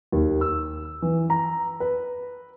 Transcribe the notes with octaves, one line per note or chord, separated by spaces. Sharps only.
D#2
E6
E3
A#5
B4